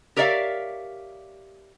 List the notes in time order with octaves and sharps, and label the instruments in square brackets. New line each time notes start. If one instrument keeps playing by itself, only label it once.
[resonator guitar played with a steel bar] G4 A#4 C#5 D5 E5 F5